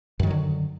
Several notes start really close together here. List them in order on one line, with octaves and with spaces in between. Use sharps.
F#2 D#3 F#3 D3